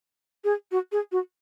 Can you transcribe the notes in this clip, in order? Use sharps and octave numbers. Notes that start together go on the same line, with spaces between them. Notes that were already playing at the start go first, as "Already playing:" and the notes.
G#4
F#4
G#4
F#4